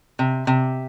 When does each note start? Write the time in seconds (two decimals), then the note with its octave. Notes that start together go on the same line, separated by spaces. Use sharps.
0.19 C3
0.47 C3